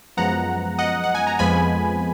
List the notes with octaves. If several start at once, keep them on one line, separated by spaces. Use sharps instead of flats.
F#2 F3 G#3 B3 F#5 A#5
D#5 F#5
F#5
G#5
A#5
F2 F3 G#3 B3 G#5 B5